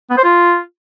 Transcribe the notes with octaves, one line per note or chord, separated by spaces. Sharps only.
B3
C5
F4